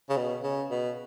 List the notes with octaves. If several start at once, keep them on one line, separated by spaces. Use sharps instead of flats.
C#3
B2
C#3
B2